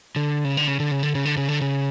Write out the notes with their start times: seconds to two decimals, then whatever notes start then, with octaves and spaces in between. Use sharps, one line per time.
0.16 D3
0.44 C#3
0.57 D3
0.67 C#3
0.80 D3
0.91 C#3
1.03 D3
1.15 C#3
1.25 D3
1.37 C#3
1.49 D3
1.61 C#3